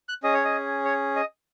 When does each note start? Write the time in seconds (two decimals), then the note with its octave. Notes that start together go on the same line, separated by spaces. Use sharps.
0.09 F#6
0.23 C#4 G#4 D#5
0.34 C#5
0.45 D#5
0.85 C#5
1.16 D#5